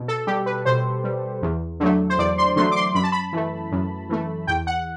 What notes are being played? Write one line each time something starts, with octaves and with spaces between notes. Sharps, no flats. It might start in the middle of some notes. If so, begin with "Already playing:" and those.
Already playing: B2
A4
G3 G4
B4
B2 C5
G3
E2
D3 F#3 A3
C5
E2 D5
C6
D3 F#3 A3 C6
D6
C6
F#2 B5
A5
B5
E3 A3
F#2
E3 A3
E2 G5
F#5